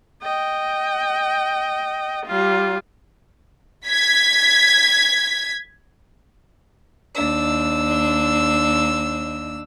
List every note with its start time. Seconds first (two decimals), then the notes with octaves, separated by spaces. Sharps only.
0.22 D#5 G5
2.26 G3 F4
3.87 G#6 B6
7.14 D#2 D4 E6